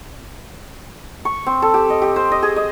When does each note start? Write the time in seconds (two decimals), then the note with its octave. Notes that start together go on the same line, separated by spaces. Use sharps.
1.25 C#6
1.46 C4
1.62 A4
1.74 G4
1.90 D#5
2.02 G4
2.16 C5
2.31 D#5
2.43 G#4
2.56 D#5